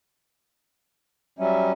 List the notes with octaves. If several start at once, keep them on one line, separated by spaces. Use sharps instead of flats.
F#3 G3 C#4 E5